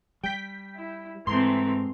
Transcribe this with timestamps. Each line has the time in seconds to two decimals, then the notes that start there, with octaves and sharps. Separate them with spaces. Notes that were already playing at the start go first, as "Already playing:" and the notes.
0.24 G3 G5 B6
0.76 E4
1.27 G#2 E3 A3 C4 A#5 C6